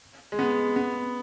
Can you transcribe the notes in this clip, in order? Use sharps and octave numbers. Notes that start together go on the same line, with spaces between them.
G#3
B3
B3